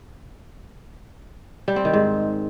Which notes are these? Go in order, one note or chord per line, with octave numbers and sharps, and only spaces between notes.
G3
C4
D#3
G#2